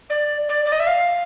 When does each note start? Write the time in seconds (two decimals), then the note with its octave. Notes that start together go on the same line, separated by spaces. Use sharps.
0.10 D5
0.49 D5
0.65 D5
0.72 D#5
0.80 E5
0.87 F5